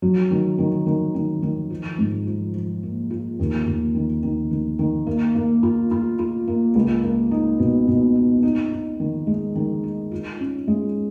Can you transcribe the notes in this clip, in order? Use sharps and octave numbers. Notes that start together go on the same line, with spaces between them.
F#3
D#3
D#3
D#3
D#3
D#3
F3
G#2
F3
F3
A#3
F4
D#2
D#2
D#3
D#3
D#3
D#3
A#3
A#3
F4
F4
F4
A#3
C#2
A#3
D#4
B2
B2
D#4
D#4
D#4
D#3
G#3
D#3
D#4
F4
C#4
G#3